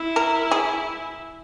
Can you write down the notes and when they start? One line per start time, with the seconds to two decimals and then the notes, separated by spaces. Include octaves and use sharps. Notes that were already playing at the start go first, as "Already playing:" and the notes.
Already playing: E4
0.16 A#4
0.51 G#4